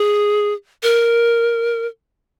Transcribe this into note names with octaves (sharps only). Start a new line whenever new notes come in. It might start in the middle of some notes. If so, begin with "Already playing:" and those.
Already playing: G#4
A#4